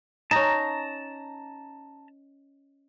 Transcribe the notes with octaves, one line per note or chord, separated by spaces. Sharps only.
C#4 D#4 A5 A#5